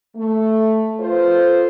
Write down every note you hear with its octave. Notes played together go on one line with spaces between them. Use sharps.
A3
F4 A4 B4 C5